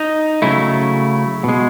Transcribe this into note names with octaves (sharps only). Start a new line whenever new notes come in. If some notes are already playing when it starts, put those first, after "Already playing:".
Already playing: D#4
C#3 F#3 A3 E4
B2 G#3